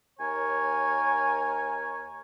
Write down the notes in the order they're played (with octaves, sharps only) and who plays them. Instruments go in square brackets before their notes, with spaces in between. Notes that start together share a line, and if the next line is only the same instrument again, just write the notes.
[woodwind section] D#2 A#4 C#5 G#5